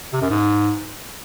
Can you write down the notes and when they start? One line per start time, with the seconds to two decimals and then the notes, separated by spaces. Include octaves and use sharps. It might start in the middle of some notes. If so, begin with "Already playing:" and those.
0.13 C3
0.22 F#2
0.30 G#2